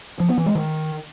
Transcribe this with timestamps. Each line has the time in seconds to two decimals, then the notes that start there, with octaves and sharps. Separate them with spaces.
0.20 F3
0.29 B3
0.38 E3
0.46 G#3
0.55 D#3